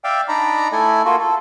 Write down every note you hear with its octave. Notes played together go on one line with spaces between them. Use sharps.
D5 E5 F5 G5
D4 D#4 D5 A#5 B5
A3 E4 A4 G#5
A#3 F4 F#4 A4
A4